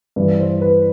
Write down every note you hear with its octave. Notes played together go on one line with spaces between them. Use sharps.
G2 E3 B4
C5
B4